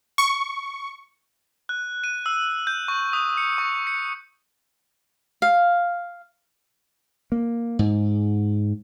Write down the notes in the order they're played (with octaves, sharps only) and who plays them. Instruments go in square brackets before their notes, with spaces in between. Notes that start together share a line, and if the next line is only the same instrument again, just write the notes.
[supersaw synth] C#6
[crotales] F#6
D#7
E6
G6
C#6
D#6
C#7
C#6
C#7
[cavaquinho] F5
[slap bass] A#3
G#2